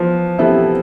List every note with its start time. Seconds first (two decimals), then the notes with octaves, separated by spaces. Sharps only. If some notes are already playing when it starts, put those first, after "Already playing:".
Already playing: E3 F3 B3
0.38 C3 E3 B3 E4 A4